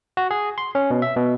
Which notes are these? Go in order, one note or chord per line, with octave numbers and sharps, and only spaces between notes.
F#4
G#4
C6
C#4
B2
E5
B2